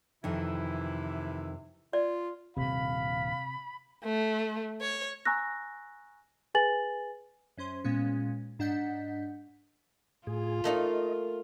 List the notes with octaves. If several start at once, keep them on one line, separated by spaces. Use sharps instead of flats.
F2 C3 D#3 E3 E4
F4 D5
D#1 G2 C3 F5 B5
A3
C#5
G#5 A#5 C#6 E6 F#6 A#6
G#4 B4 G#5 A6 F#7
F#2 C#4 C5 C6
A#2 G#3 B3 C#4
G#2 D4 D#5 F#5 G6 B6
A2 F4 G#4
A3 A#3 D#4 D#5